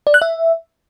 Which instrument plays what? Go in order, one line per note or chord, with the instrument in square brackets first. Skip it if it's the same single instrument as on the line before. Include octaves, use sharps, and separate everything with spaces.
[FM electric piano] D5
F#6
E5